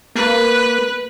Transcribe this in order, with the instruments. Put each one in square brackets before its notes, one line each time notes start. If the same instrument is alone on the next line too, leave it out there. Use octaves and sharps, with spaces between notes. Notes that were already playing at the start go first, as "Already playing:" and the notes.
[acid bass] A#3 [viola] B4